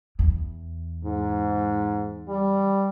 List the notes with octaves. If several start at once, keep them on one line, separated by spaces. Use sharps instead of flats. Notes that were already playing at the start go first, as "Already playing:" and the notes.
E2
G#2
G3